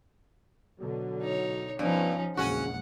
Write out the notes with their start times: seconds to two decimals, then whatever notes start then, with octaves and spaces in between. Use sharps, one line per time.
0.80 B2 D3 F#3
1.22 D#4 C#5
1.79 G2 F3 B3 C#4 D#4
2.37 A#1 E2 C#3 G#3 C#4 F#4 F#5